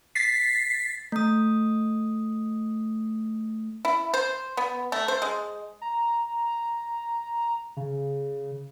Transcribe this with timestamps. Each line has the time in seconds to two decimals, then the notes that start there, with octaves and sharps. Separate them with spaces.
0.15 A6 B6 C7
1.12 A3 D#6
3.85 E4
4.14 C5
4.57 B3
4.92 A3
5.08 C5
5.22 G#3
5.81 A#5
7.77 C#3